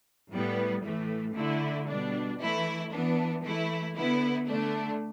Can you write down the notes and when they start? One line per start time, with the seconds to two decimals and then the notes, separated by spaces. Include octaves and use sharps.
0.32 A2 G3 B3
0.84 A2 E3 A3
1.36 D3 A3 E4
1.88 B2 G3 D4
2.39 E3 A3 E4
2.91 E3 B3 D4
3.44 E3 A3 E4
3.96 D3 B3 E4
4.47 D3 A3 D4